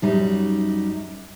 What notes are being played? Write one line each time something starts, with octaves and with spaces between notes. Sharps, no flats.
F#2 G3 D#4